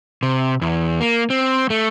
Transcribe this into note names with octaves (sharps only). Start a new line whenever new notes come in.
C3
E2
A#3
C4
A3